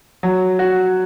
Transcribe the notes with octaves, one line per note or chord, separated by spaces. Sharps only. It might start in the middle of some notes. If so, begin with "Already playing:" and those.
F#3
F#4